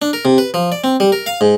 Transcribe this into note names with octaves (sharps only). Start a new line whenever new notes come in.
D4
A#4
C3
B4
F3
D5
C4
G3
A#4
F5
G#2